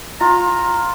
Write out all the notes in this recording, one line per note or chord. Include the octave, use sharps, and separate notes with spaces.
F4 A#5